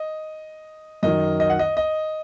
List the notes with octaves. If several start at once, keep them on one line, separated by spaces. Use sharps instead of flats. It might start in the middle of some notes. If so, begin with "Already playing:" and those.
Already playing: D#5
F#2 D#3 F#3 D#5
D#5
F#5
D#5
D#5